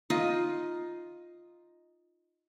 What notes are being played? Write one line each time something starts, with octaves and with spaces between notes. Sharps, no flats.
D#4 F4 D#5